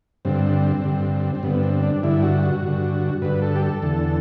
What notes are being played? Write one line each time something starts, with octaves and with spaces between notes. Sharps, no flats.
G2 D3 C4
G2 D3
C4
G2 D3 B3
C4
D4
G2 D3 E4
F#4
F#4
G2 D3
G2 D3 B4
A4
G4
A4
E2 D3